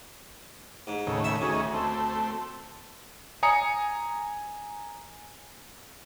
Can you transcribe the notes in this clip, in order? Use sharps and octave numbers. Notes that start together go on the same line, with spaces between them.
G#2
D#2 A2 C#3
E5
D2 D#3 C#4 G#4
A3 C4
G#5 A#5 D#6 C#7